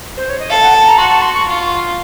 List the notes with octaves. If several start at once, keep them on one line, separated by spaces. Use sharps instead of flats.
C5
C#5
D#5
A4 F5
F#5
A5
A#5
F#4 C6
A5
C6
C#6
F4